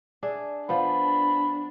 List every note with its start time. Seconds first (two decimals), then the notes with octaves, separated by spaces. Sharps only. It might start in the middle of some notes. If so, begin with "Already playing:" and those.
0.23 D4 G#4 E5
0.69 F3 B3 D4 B5